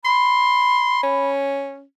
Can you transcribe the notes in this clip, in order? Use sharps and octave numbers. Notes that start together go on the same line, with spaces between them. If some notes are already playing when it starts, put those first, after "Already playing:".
B5 C6
C#4